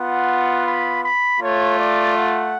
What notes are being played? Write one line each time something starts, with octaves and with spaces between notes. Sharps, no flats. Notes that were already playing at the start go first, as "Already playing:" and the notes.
Already playing: B3 F4 F#5
B5
B5
A3 F4 C#5
D5
F#5